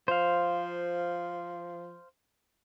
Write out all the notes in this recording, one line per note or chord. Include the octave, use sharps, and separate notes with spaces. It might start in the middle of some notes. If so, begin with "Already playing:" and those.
F3 C5 F5